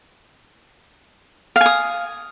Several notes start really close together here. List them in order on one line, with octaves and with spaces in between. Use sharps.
F5 G#5 D#6